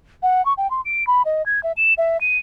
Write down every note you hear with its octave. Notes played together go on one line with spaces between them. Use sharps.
F#5
C#6
G5
C6
D7
B5
D#5
G#6
E5
E7
E5
D#7